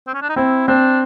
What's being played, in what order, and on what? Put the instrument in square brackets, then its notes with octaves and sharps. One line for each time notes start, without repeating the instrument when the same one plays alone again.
[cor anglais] C4
C#4
D4
D#4
[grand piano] C4 [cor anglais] E4
[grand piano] C4 [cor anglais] D4